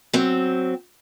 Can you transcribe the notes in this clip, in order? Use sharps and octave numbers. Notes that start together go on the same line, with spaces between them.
F#3 C4